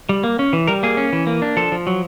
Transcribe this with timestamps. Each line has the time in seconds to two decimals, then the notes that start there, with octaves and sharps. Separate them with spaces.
0.09 G3
0.24 A#3
0.39 C#4
0.53 E3
0.67 G3 A#4
0.83 A#3 G#4
0.97 C#4
1.13 E3
1.27 A#3
1.42 D4
1.57 F3 A4
1.72 F3
1.87 F#3